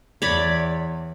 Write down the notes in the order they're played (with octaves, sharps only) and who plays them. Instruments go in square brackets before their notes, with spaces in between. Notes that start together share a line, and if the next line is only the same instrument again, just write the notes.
[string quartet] E2 [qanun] C#5 D5 B5